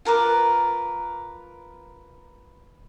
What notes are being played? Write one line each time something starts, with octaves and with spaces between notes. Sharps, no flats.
F4 A#4 B4 D6